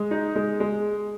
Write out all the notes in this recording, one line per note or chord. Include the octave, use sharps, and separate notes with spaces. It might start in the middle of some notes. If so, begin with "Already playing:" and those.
Already playing: G#3
D#4
G#3
G#3